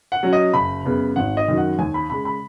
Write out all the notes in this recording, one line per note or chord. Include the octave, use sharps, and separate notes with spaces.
F#5
F#3 C#4
D#5
F#1 B5
F#2 C#3 B3
G#1 F#5
D#5
F#2 D#3 F#3
F#5
D#2 G#5
B5
C#3 G#3 B5
B5